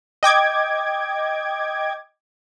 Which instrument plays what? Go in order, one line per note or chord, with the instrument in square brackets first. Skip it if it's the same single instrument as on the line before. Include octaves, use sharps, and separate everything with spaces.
[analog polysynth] D#5 G5 D6 G#6